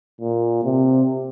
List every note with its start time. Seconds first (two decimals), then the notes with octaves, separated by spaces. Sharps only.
0.21 A#2
0.64 C3